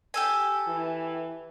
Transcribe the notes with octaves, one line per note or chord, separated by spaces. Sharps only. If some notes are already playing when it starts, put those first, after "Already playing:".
G4 A4 G#5
E3